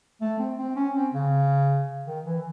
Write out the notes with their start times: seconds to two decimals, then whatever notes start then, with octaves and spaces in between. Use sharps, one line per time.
0.21 A3
0.39 C4
0.58 C4
0.76 C#4
0.95 C4
1.13 C#3
2.06 D#3
2.25 E3